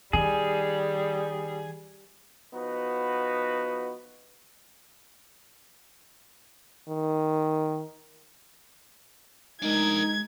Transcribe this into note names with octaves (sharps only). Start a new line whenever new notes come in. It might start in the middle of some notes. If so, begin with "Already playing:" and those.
D#3 G3 G#4
F3 B3 D#4 F#4 B4
D#3
G#3 D4 D#4 A#4 G#6